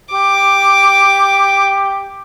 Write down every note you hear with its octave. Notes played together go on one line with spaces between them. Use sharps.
G4 D6